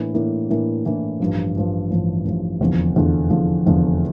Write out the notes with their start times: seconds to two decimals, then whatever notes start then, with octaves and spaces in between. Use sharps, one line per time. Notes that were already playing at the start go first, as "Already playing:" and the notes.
Already playing: A2 E3 A#3 D4
0.14 A2 E3 A#3 D4
0.50 A2 E3 A#3 D4
0.85 A2 E3 A#3 D4
1.20 A1 G2 F3
1.55 A1 G2 F3
1.90 A1 G2 F3
2.25 A1 G2 F3
2.60 F1 E2 D3 F3
2.95 F1 E2 D3 F3
3.30 F1 E2 D3 F3
3.66 F1 E2 D3 F3